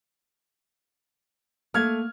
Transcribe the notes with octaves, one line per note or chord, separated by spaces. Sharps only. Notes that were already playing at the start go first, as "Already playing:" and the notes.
A3 A#3 F6 G#6